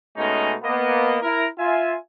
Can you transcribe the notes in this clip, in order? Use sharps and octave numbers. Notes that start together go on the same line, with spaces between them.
B2 G#3 A3 C#4 D#4
A#3 B3 D#5
E4 A#4
F4 E5 G#5